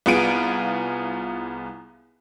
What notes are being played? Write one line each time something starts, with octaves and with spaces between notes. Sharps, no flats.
C2 B3 F4 G#4 D7 D#7